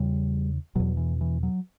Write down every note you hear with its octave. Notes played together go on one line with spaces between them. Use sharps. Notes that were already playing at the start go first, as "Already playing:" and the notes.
Already playing: E2 C#3 G3
E2 B2 F#3
E3
E3
F#3